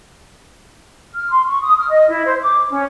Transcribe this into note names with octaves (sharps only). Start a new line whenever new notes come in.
F6
C6
C#6
D#6
F6
D#5
E4
C5
D6
C#4